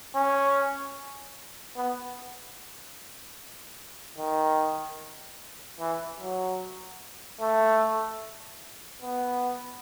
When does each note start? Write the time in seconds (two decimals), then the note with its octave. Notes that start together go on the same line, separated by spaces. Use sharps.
0.15 C#4
1.76 B3
4.18 D#3
5.80 E3
6.20 F#3
7.40 A3
9.02 B3